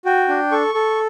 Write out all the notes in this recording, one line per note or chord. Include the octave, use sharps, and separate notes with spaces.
F#4 G5
D4
A4 C#6
A4